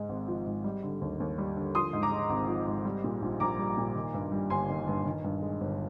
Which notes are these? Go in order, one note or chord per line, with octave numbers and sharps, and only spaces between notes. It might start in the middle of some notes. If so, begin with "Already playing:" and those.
Already playing: G#2 G#3
G#1
F3
G#2
G3
D3
D#2
D#2
G3
D3
F3 C6 D#6
G#2
A#5 D6
G#3
G#1
F3
G#2
G3
A#2
A#1
A#1 A#5 D6
G3
A#2
D#3
G2
G3
G1 G#5 C6
D#3
G2
D#3
G2
G#3
G1